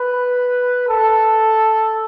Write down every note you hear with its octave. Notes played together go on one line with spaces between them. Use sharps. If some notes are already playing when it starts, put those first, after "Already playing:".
Already playing: B4
A4